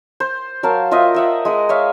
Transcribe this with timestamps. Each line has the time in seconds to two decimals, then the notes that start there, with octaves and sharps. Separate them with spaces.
0.20 C5
0.63 F#3 A#4 F5 A5
0.91 F4 C5 D#5 E5
1.14 D#5 E5 F#5
1.45 G#3 F#5 D#6
1.69 C#5 E5 F5